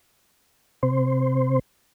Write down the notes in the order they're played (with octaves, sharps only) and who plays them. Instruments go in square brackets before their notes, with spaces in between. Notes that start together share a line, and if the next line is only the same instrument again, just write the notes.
[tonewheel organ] C3 C5